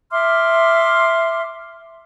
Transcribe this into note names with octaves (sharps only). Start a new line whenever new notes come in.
E5 C6 D6 F6